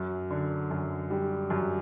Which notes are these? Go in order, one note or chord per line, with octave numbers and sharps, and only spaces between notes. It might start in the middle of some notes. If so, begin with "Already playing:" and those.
Already playing: F#2
D3
F#2
G3
F#2